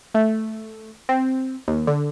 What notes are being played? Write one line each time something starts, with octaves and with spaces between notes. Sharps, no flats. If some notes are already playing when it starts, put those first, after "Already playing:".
A3
C4
D#2
D3